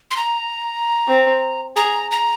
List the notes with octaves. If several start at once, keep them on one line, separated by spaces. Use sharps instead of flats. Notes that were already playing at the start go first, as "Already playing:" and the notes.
C6
A#5
C4
G#4 A#5
A#5